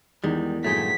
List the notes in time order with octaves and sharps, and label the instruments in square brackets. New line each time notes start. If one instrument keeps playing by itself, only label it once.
[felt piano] E2 [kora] D#3 [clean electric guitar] G3 G#3
[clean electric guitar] G2 A#2 A3 [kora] F#3 G#4 G5 [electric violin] B6